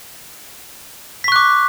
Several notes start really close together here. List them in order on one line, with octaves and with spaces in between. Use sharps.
B6 C#6 F#6 D6